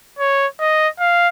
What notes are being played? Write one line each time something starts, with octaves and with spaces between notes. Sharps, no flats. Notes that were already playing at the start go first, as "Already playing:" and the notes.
C#5
D#5
F5